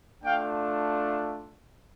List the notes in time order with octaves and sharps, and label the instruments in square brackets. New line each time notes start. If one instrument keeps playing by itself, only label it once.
[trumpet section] A3 D4 F4 F5 G5